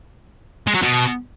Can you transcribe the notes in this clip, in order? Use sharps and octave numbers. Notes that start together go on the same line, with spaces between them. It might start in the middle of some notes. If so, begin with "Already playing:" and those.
G#3
F#3
B2